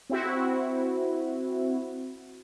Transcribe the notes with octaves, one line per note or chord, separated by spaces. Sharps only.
C4 E4 F#4